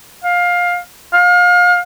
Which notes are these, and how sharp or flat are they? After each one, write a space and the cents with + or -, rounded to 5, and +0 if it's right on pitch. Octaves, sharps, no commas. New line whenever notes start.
F5 +20
F5 +35